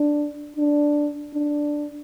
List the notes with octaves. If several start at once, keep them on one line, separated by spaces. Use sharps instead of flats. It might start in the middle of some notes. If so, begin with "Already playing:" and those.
Already playing: D4
D4
D4